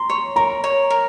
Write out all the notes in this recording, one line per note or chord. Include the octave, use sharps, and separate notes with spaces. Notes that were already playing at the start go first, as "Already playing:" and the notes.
Already playing: A#5 C6
C#5
A#4 A#5
C#5
A#4